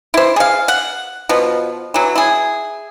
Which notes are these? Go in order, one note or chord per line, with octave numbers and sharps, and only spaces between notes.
E4 C5
G#4 F5
F#5
B2 F3 B3
E3 F#3
E4 G#4